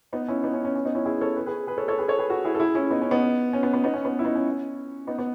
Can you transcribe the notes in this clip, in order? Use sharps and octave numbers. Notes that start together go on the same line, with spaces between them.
B3 D#4
C#4 E4
B3 D#4
C#4
C#4
C#4
B3 D#4
C#4 E4
E4 G#4
A4 C#5
G#4 B4
G#4 B4
G#4 B4
A4 C#5
A4 C#5
G#4 B4
A4 C#5
G#4 B4
F#4 A4
E4 G#4
A4
E4 G#4
C#4 E4
B3 D#4
C#4
B3 D#4
C#4
B3
B3
B3 D#4
C#4
B3
E4
B3 D#4
C#4
B3 D#4
B3